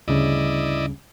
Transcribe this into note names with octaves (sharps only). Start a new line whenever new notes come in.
D2 G2 C#3 E4 D5 D#5